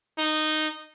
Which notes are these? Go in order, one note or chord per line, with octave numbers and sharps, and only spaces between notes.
D#4